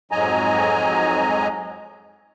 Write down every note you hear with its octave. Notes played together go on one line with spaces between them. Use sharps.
F2 G#2 F#3 D#5 G#5 A#5